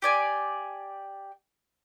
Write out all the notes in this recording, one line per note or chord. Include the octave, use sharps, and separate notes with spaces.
G4 D5 G#5